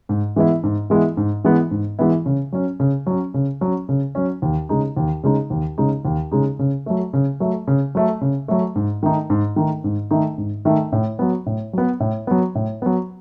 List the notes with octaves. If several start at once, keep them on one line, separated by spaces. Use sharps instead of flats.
G#2
E3 G#3 B3 E4
G#2
E3 G#3 B3 E4
G#2
E3 G#3 B3 E4
G#2
E3 G#3 B3 E4
C#3
F#3 C#4
C#3
F#3 C#4
C#3
F#3 C#4
C#3
F#3 C#4
D#2
C#3 G#3 D#4
D#2
C#3 G#3 D#4
D#2
C#3 G#3 D#4
D#2
C#3 G#3 D#4
C#3
F#3 A3
C#3
F#3 A3
C#3
F#3 A3
C#3
F#3 A3
G#2
D#3 A3 D#4
G#2
D#3 A3 D#4
G#2
D#3 A3 D#4
G#2
D#3 A3 D#4
A2
F#3 B3
A2
F#3 B3
A2
F#3 B3
A2
F#3 B3